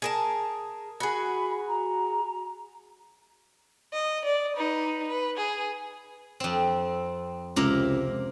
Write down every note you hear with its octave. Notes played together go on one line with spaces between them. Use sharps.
G#4 A#4 A5
F#4 G#4 B5
A#5
D#5
D5
D#4 B4
B4
G#4
F2 C4
C#2 C3 A#3 A#4